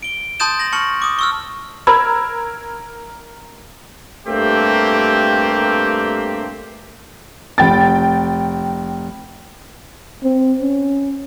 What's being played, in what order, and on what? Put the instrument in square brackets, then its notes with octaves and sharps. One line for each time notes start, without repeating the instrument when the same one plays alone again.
[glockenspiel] D7 G7
A5 C6 D#6 G6 A6 E7
A#6 F#7
A5 C#6 F6 C#7 F#7
D6 D#6
C#6 E6 F6
[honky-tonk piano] A#4 E6 G#6 [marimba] B5
[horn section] G2 A3 A#3 C4 G4
[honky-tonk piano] F1 G5 A6
[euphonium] C4
C#4